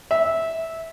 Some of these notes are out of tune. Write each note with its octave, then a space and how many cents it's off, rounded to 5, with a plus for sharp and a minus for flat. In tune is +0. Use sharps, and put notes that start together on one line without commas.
E5 -15